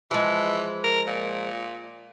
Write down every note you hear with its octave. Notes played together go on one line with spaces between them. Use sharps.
E3 F3 G#3
A#4
A#2